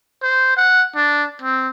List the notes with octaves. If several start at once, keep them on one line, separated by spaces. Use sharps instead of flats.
C5
F#5
D4
C4